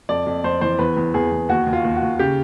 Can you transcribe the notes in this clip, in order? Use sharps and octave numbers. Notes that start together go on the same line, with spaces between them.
F2 D5
F2
F2 C5
E3 C5
E2 B4
E2
E2 G#4
E2
D#2 F#4
D#2
F4
D#2
F#4
D#2
C#3 G4